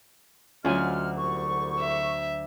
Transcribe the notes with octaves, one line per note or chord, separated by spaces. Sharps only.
D2 F#3 G#3 C#4 F4 G#5 C6 F6
C2 D3 C#6
E5